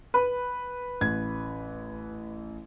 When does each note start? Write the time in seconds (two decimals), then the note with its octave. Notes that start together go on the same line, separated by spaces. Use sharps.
0.14 B4
1.01 A1 G#6